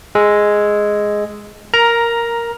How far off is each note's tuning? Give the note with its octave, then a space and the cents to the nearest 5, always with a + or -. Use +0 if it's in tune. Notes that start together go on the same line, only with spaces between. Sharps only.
G#3 +0 E6 +0
A#4 +0 A#5 +10